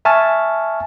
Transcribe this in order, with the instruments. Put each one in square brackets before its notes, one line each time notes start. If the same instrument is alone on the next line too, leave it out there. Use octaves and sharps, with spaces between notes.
[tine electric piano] E5 G#5 A5 C#6 F6